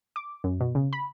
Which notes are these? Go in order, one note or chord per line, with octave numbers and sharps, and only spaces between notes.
D6
F#2
B2
C#3
B5